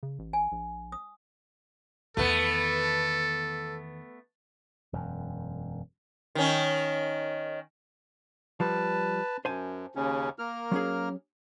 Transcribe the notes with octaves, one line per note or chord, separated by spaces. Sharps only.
C#3
A1
G#5
A#1
D#6
E2 D#3 A3 B3 A4
E1 F#2
D#3 C#4
F3 G3 B4 A5
F#2 C5 G#5 A5
D#2 C#3 C#4
A#3 A#4 F6
F#3 C#4 G#4